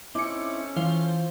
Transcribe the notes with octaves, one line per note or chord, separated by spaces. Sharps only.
A3 C4 C#4 D#4 E4 D6 C#7
E3 F4 C5 F5